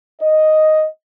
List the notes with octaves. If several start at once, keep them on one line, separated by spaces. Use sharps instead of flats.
D#5